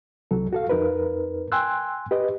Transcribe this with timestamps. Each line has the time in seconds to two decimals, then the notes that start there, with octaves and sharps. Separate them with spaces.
0.31 C2 F#3 A4
0.53 F#4 A4 F5
0.69 F2 D#4 A#4 B4
1.52 G5 G#5 C6 E6 F#6
2.11 G4 B4 D#5